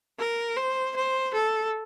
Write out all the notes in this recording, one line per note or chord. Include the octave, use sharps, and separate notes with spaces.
A#4
C5
C5
A4